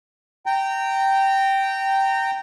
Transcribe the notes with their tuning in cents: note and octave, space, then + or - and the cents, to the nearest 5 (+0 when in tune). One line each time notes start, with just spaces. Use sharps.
G5 -10 A#5 -25